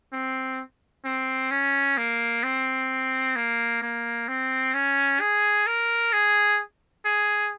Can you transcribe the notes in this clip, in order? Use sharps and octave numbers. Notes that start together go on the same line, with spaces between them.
C4
C4
C#4
A#3
C4
A#3
A#3
C4
C#4
G#4
A#4
G#4
G#4